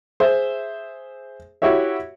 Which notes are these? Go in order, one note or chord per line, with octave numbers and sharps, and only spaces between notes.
G#4 C5 E5
E4 F#4 G4 C#5 E5